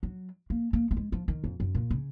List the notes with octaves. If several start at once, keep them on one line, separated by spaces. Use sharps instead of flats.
F#3
A#3
A#3
A#3
G#3
F3
D#3
F2
F#2
A#2
C#3